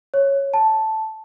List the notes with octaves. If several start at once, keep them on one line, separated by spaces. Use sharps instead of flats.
C#5
A5